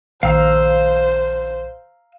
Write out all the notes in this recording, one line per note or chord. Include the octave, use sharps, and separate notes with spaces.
A#1 D#3 C5 F5 A#5 E6